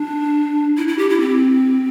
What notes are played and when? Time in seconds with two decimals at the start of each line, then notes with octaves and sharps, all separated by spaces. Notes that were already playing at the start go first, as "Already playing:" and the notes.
Already playing: D4
0.77 E4
0.88 E4
0.98 G4
1.10 E4
1.20 C4